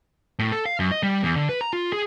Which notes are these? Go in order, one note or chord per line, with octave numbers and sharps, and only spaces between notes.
A2
A4
F5
F#2
D#5
G3
E2
D3
B4
A#5
F4
G#4